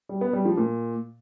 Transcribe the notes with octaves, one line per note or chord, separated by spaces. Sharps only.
G3
B3
G3
F3
A#2